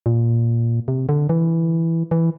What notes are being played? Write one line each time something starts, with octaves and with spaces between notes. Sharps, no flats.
A#2
C3
D3
E3
E3